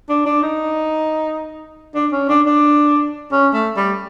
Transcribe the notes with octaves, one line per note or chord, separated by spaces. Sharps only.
D4
D4
D#4
D4
C#4
D4
D4
C#4
A3
G3